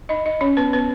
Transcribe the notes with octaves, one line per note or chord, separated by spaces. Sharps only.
D#4 D#5
D#4 D#5
C#4 C#5
B3 B4
B3 B4